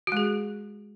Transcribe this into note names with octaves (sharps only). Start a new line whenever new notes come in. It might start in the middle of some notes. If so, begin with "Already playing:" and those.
G#3 F#4 G#4